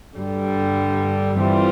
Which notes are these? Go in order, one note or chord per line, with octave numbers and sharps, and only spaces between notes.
G2 D3 G3
E3 G3 C4 F4